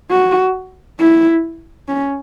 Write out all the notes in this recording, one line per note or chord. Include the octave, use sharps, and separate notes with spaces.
F#4
E4
C#4